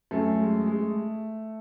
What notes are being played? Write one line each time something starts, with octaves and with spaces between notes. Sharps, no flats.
F#2 A3
G#3
G#3